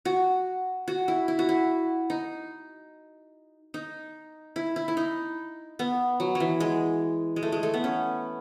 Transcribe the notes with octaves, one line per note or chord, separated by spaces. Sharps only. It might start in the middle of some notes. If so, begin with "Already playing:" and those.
F#4
F#4
E4
E4
F#4
E4
D#4
D#4
E4
E4
E4
D#4
B3
F#3
F#3
E3
G#3
G#3
A3
G#3
A3
B3
C#4